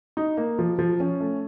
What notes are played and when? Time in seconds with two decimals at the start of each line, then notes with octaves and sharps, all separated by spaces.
0.17 D#4
0.37 A#3
0.59 F3
0.79 F3
1.00 C#4
1.20 A3